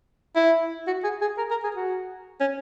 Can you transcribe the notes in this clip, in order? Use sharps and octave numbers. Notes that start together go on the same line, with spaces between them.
E4
F#4
G#4
G#4
A#4
A#4
G#4
F#4
C#4